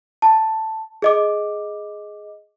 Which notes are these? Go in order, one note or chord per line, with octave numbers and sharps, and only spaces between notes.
A5
G#4 D#5 D6